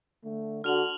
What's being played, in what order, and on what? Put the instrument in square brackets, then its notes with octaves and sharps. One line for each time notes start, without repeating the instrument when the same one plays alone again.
[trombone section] D3 A3
[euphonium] D3 [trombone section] F#4 [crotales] F6 F7 F#7